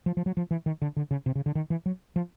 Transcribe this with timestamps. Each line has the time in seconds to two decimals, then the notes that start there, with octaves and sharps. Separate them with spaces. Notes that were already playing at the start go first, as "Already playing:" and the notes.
0.06 F3
0.17 F3
0.26 F#3
0.37 F3
0.51 E3
0.66 D#3
0.82 D3
0.97 D3
1.11 C#3
1.26 C3
1.35 C#3
1.46 D3
1.55 D#3
1.70 E3
1.86 F#3
2.16 F3